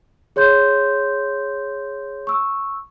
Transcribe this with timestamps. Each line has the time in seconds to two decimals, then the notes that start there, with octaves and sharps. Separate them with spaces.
0.36 G#4 C#5 C6 G6
2.27 C#6 E6